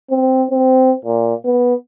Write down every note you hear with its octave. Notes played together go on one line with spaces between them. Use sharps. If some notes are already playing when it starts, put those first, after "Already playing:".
C4
C4
A#2
B3